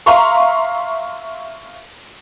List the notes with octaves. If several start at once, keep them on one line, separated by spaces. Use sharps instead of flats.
E5 F5 A#5 C6 C#6